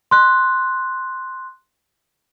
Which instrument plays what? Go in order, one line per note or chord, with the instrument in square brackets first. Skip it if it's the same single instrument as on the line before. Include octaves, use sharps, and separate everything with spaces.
[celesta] C6 F#6